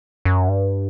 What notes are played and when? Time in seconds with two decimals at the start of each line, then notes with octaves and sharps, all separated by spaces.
0.25 F#2
0.48 G2